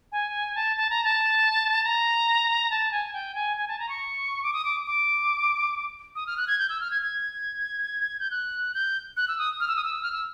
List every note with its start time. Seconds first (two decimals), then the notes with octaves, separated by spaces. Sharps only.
0.12 G#5
0.55 A5
0.77 A5
0.90 A#5
1.04 A5
1.84 A#5
2.71 A5
2.92 G#5
3.13 G5
3.35 G#5
3.57 G#5
3.68 A5
3.79 A#5
3.89 C#6
4.43 D6
4.53 D#6
4.65 D6
4.86 D6
6.16 D#6
6.27 F6
6.37 F#6
6.48 G#6
6.59 G6
6.69 E6
6.81 F6
6.91 G#6
7.02 G#6
8.20 G6
8.31 F#6
8.74 G6
9.17 F#6
9.28 E6
9.38 D#6
9.60 F6
9.68 E6
9.76 D#6
9.84 E6
10.03 F6
10.12 E6